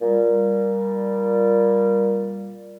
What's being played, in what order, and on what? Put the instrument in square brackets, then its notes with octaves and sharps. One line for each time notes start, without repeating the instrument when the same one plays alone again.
[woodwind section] A#2 G3